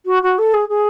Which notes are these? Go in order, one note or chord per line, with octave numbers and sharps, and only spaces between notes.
F#4
F#4
A4
G#4
G#4